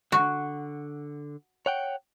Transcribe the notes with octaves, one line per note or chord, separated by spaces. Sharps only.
D3 F#4
C#5 F#5 G5